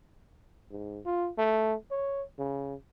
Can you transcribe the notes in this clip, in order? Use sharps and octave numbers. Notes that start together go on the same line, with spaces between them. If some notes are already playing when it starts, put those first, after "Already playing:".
G#2
F4
A3
C#5
C#3